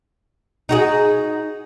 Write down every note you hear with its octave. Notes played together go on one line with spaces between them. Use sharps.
D#4 F#4 G#4